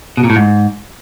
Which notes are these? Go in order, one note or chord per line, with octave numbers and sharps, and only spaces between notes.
B2
A#2
A2
G#2